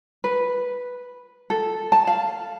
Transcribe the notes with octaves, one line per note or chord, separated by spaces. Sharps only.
B4
A4
A5
F5